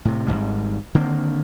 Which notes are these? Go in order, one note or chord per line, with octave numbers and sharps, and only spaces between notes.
A2 C3
G#1 E2 G#2 G3
D3 D#3 A#3 C4